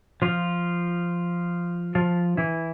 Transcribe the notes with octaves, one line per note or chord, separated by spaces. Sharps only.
F3 F4
F3 F4
E3 E4